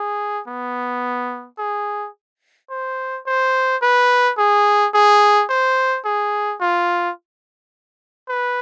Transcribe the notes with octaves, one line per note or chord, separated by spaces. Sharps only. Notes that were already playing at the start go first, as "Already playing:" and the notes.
Already playing: G#4
B3
G#4
C5
C5
B4
G#4
G#4
C5
G#4
F4
B4